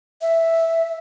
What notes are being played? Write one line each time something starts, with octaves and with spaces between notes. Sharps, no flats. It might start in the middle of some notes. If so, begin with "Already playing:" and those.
E5